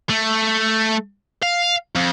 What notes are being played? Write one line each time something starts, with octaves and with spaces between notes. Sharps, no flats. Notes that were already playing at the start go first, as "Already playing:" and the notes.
A3
F5
F2